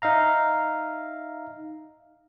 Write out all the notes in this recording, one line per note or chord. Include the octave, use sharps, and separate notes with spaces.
D#4 E5 F5 A#5